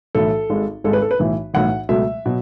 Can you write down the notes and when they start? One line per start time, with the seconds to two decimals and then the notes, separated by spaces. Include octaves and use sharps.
0.15 B1 A2 E3 A4
0.50 G#1 G#2 G#3
0.84 G#1 G#2 G#3 A4
0.93 B4
1.02 A4
1.11 B4
1.19 B1 A2 E3
1.54 B1 A2 E3 F#5
1.89 C#2 B2 F#3 A3 E5
2.26 B2 F#3